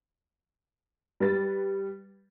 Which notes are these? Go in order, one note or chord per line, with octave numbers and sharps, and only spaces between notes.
G3 B4 A6